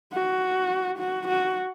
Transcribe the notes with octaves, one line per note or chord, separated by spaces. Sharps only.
F#4
F#4
F#4